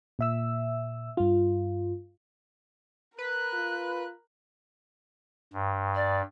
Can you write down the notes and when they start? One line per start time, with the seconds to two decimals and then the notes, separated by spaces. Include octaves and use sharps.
0.19 A#2 E5 E6
1.17 G2 F4
3.18 A#4 B4 F#6
3.53 F4
5.53 G2
5.95 D5